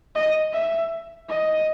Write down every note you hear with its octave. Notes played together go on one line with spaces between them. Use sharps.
D#5
E5
D#5